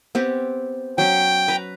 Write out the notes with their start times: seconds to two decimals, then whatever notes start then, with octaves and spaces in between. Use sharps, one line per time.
0.15 B3 C4 G4
0.98 F#3 C#4 G5
1.48 B4 A#5